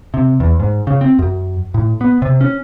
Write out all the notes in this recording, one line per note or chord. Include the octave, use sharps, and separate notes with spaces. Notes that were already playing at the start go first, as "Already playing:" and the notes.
C3
E2
G#2
C#3
C4
F#2
A2
B3
C3
C#4